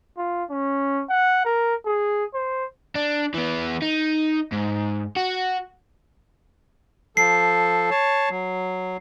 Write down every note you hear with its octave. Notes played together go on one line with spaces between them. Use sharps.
F4
C#4
F#5
A#4
G#4
C5
D4
E3 B3
D#4
G#2
F#4
F3 A4 C7
C#5 A5
F#3